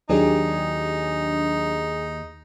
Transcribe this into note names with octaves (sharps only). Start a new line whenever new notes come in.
D#2 F#3 D4 D#4 G4 G#4